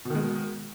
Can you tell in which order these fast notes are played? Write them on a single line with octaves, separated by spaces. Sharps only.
B2 D#3 G#3